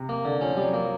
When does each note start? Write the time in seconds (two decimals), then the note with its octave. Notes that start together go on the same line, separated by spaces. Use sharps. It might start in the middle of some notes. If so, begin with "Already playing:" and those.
Already playing: C3
0.09 A#3
0.25 D3
0.41 F3 C#4
0.57 G3
0.62 F#3
0.73 F#3 A#3